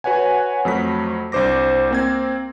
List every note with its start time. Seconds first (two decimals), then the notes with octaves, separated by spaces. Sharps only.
0.04 F#4 B4 C#5 F#5 G#5
0.65 F2 F#3 A3 B6
1.32 C2 D4 C5 D6 A#6
1.91 A#3 C4 G#6